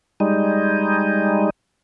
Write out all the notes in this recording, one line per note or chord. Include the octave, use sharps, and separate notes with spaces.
G3 G#3 D#4